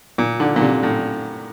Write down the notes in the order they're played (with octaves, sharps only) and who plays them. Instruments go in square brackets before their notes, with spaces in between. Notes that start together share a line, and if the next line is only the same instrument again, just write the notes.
[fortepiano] A#2
D3
A#2
C3
A2